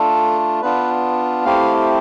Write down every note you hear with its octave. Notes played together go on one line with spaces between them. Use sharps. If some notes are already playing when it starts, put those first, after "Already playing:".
Already playing: A3 D4 F4 A4
B3 D4 F4 B4
A3 C4 E4 G4 F5